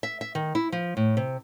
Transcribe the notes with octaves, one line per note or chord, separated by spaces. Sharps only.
E5
E5
D#3
E4
F3
A2
C3